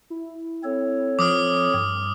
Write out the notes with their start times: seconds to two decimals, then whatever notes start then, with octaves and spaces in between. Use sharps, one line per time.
0.10 E4
0.64 C4 A4 C#5
1.19 F3 D6 D#6 F6
1.74 G2